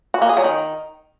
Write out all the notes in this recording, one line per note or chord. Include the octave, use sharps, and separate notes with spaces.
F#4
A#3
G#4
F#3
D#3